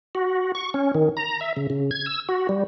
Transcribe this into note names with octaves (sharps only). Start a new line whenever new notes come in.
F#4
C#6
C#4
D#3
A#5
E5
C#3
C#3
G#6
E6
F#4
G3